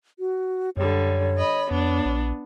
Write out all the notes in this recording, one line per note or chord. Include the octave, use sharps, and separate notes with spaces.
F#4
F#2 D3 G3 C#5
D#5 B5
F2 B3 D4
A#1